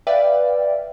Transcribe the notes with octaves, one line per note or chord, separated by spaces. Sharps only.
B4 D5 E5 F5 G5